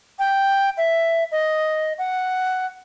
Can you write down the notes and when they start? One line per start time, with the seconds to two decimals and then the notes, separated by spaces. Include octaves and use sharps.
0.19 G5
0.77 E5
1.32 D#5
1.98 F#5